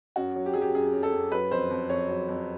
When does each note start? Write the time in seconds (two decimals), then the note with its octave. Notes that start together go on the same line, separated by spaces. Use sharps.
0.16 F#2 F#4
0.36 F#3
0.46 G4
0.53 F#3 G#4
0.61 G4
0.74 F#2 G#4
0.93 F#2
1.03 A4
1.13 F#2
1.32 F#3 B4
1.51 F2 C5
1.70 F2
1.90 F2 C#5
2.09 F#3
2.28 F2